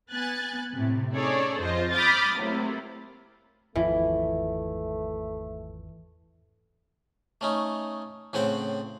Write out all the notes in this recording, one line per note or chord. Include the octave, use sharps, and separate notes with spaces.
B3 G#5 F#6 A6
A2 C3
C#4 D#4 G#4 A4 C#5 D5
F2 F4 C5 D#5
B5 D6 D#6 F6 G6 A6
C3 F#3 A3 A#3 E4
G#1 E2 E3 F3 A3
A3 C#4 D#4
A2 C#3 C4 F#5 G5